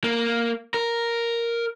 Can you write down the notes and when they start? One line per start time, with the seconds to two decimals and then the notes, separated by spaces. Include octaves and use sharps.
0.04 A#3
0.74 A#4